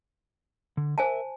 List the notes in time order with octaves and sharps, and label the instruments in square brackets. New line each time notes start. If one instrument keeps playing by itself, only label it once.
[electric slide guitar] D3
[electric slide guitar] A#4 E5 [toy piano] C5 G#5 A5